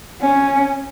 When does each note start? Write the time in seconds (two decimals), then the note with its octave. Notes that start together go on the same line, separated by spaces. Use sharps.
0.21 C#4